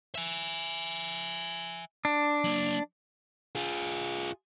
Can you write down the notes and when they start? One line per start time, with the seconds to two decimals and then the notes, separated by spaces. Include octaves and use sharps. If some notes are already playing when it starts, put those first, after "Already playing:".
0.15 E5 G#5
2.05 D4
2.44 F#3 A#3
3.55 F4 G#4